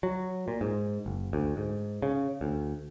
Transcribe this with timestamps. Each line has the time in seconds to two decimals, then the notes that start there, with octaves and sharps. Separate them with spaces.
0.03 F#3
0.48 A#2
0.61 G#2
1.06 F#1
1.33 D2
1.57 G#2
2.02 C#3
2.41 D2